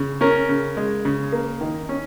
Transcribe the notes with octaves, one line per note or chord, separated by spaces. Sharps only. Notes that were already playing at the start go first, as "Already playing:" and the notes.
Already playing: C#3
C#4 A#4
C#3
G#3
C#3
A#3
D#3
C#4